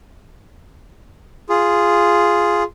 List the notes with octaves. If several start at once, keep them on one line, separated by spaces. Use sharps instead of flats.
F4 G#4